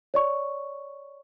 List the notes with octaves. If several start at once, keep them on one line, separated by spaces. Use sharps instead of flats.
C#5 D5 C#6